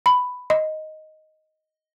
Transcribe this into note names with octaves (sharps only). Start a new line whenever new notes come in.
B5
D#5